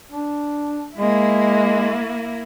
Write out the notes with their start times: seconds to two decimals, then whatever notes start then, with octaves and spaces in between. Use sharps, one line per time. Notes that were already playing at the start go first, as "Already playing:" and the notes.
0.12 D4
0.97 G#3 A#3 E4